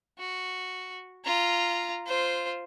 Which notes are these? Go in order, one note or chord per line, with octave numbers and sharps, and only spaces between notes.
F#4
F4 A#5
F4 C5